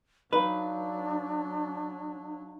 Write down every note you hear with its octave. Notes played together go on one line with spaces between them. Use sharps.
F#3 D4 D#4 B4 F5